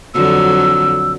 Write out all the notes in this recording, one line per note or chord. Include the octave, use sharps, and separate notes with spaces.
F2 D3 F#3 E6